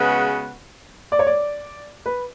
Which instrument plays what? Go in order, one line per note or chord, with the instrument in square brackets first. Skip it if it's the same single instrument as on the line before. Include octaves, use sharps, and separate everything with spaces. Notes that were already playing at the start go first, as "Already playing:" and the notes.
Already playing: [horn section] C#3 G#3 B3 F#4 B4
[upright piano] D5
C#5
D5
B4